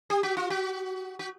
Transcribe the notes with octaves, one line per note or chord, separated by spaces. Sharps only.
G4
F#4
F4
F#4
F#4